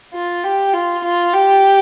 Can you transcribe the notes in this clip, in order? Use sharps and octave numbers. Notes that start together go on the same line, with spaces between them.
F4
G4
F4
F4
G4